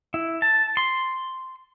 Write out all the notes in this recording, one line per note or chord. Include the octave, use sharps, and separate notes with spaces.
E4
A5
C6